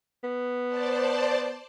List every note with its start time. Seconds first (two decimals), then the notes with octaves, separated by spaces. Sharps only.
0.24 B3
0.67 C5 D5 A5